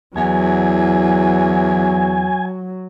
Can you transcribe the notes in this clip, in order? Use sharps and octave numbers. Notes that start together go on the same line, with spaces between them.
E2 F#3 G#5